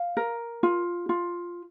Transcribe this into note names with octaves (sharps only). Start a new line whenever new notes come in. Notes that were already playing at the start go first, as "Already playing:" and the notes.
Already playing: F5
A#4
F4
F4